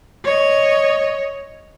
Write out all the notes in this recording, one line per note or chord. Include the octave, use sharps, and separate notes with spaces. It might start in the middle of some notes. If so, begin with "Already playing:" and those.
C#5 D#5